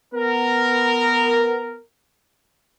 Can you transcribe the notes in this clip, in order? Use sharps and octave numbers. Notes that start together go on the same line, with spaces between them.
B3 A#4